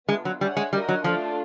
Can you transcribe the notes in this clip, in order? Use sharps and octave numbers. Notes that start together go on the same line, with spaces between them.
G#3 B3 D4 F4
F#3
G3 G#4 C#5 F#5
G#3
G3 F#4 A#4 D#5
F#3
F3 A3 D4 F4 A4